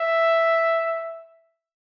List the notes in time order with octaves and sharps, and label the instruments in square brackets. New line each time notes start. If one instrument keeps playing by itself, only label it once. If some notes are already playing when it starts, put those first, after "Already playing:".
Already playing: [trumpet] E5